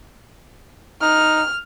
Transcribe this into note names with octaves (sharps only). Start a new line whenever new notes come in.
D#4 F6